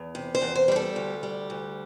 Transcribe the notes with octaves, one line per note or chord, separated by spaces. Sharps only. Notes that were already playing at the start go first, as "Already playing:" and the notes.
Already playing: E2
C3
C5
E2
C5
G3 C5
A4
D2
G3
D2